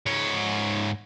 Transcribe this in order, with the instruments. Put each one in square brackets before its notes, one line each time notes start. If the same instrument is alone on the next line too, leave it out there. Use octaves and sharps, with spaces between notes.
[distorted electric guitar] G#2 C#5